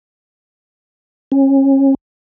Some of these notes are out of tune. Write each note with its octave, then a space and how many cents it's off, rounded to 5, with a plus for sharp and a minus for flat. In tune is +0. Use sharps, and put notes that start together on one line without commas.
C#4 -30